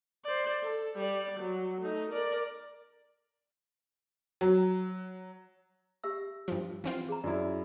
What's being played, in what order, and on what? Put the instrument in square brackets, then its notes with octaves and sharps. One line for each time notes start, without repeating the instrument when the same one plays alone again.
[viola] C5 D5
A4
G3 D5
F#3
A3 D#4
A#4 D5
[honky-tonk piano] F#3
[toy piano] G4 E5 E6
[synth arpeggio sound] G2 F3
E3 C4 F4
[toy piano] G#4 A#5
[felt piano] F#2 E4 [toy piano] D5